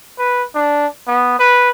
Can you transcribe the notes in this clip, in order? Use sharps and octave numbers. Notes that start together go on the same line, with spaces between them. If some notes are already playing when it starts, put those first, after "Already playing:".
B4
D4
B3
B4